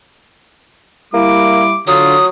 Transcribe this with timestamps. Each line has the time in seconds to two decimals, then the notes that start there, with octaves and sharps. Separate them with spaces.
1.14 G3 A#3 E4 D6
1.87 D3 F#3 F4 D#6